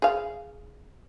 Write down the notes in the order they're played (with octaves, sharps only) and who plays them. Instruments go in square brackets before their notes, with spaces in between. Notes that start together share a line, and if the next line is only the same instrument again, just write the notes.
[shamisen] G#4 F5